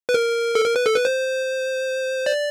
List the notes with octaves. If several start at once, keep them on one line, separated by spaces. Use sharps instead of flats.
B4
A#4
A4
A#4
B4
A4
B4
C5
D5